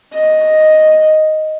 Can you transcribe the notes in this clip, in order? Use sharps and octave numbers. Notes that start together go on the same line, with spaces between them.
D#5